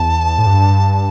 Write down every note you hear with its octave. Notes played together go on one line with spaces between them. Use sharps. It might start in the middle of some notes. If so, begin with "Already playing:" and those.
Already playing: E2 A5
A2
G2